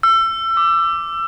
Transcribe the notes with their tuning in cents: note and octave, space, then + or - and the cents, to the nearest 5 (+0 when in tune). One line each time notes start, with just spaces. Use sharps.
E6 +30
D6 +0